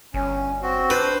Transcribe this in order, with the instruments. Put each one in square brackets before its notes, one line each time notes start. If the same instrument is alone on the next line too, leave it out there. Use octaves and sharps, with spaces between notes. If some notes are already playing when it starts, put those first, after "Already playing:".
[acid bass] G1 [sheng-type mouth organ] C#4
[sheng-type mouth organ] C4 F#4
[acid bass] D4 [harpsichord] B4 [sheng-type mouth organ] C5